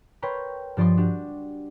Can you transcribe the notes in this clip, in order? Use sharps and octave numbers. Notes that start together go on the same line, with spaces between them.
A#4 B4 C#5 G5 A#5 C6
G2 F3 D5 D#5 C6
D4 F#4 G4